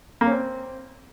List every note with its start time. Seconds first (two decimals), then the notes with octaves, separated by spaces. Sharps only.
0.21 A#3
0.26 C#4
0.31 C4